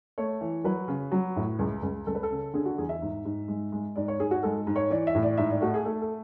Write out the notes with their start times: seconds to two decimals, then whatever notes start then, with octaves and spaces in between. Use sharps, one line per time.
0.18 A3 C#5
0.41 E3
0.64 F#3 B4
0.88 C#3
1.12 F#3
1.36 A2
1.59 C#2
1.83 C#2
2.07 C#2 A4
2.15 B4
2.23 A4
2.31 C#3
2.54 D3 G#4
2.65 F#4
2.78 E2 G#4
2.89 E5
3.02 G#2
3.25 G#2
3.48 G#3
3.72 G#3
3.96 G#2 D5
4.08 C#5
4.19 G#2 G#4
4.31 F#4
4.43 G#3 A4
4.67 G#2
4.76 C#5
4.90 E3 D5
5.07 E5
5.15 A2
5.23 D5
5.37 G#2 E5
5.51 D5
5.61 A3 F#4
5.74 G#4
5.85 A3 A4
6.01 A4